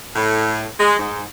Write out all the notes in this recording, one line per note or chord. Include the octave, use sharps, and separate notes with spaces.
A2
G#3
G#2